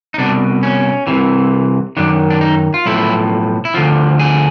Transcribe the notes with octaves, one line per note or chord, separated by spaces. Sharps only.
D#4
C2 B2 D4
C#4
C2 C3 E3
F#2 D#3 D4
D4
D#4
F4
B1 A2 F3 E4
E4
D2 D3 F3 F4
G#4